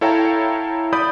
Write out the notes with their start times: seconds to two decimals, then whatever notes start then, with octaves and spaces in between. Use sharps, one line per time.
0.01 E4 A4 C#5 F5 G5 A#5
0.93 D5 B5 D#6 G6